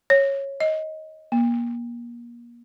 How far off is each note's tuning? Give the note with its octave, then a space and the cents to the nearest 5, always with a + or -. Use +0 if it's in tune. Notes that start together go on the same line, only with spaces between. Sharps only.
C#5 -10
D#5 +15
A#3 +35